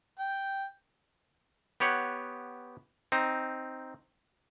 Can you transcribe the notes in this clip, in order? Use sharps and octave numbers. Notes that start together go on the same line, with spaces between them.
G5
B3 G4 C#5 F#5
C4 D#4